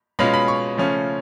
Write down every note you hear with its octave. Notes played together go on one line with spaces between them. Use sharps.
B2 G#3 C#4 F4 B5
B5
C#6
C#3 F3 A3 C#4 F4